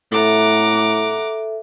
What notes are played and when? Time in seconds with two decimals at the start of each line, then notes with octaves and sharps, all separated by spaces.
0.12 A2 A4 E5 F#5 A#5 D6